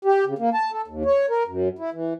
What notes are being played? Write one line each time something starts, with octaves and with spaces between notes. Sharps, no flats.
G4
C#3
A#3
A5
A4
D#2
C#5
A#4
F#2
E4
E3